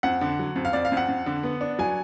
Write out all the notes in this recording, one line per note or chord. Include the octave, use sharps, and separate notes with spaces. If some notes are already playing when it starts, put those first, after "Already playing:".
F2 F#5
D3
F#3
F2
F5
F2 D5
F5
F2
F#5
F2
D3
B3
D4
F#3 G#5